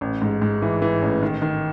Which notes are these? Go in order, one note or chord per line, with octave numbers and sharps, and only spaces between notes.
A1
G#2
G#2
E3
E3
A1
D#3
D#3